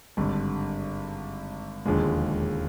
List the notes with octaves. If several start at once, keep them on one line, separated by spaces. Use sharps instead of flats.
G#1 G2 D3
E1 D#2 D3 F3 G#3